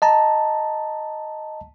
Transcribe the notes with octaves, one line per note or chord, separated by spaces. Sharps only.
D#5 A5 A#5